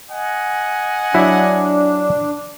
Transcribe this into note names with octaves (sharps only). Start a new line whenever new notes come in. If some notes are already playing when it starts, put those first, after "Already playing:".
D#5 F#5 G#5
F#3 D4 E4 E5